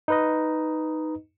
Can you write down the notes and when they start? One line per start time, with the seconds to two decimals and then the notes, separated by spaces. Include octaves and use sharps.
0.08 D#4 B4 D#5